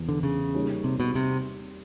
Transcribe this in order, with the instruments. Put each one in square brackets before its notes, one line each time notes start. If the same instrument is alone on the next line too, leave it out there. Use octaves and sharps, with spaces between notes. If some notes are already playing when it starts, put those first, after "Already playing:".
Already playing: [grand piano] E2 C3 E3
[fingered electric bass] D3
C#3
[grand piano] G3 A#3 D#4 G#4 C#5
[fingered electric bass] C3
B2
C3